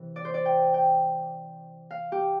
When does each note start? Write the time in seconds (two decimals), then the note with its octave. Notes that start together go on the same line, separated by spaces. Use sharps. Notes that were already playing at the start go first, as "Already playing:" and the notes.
Already playing: C3 E3
0.16 D5
0.25 C5
0.34 D5
0.45 G5
0.74 G5
1.91 F5
2.12 G4